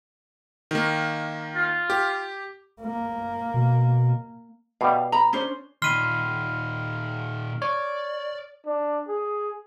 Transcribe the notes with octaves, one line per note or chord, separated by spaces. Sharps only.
D#3 A#3
F4
G4
A#3
B2
B2 G3 F5
A#5 B5
C#4 D4 C5
A#2 D#3 B5 C6 F6 D#7
C#5 D5
D4
G#4